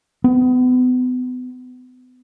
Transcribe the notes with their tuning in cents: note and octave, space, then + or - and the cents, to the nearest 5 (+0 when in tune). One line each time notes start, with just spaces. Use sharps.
B3 +35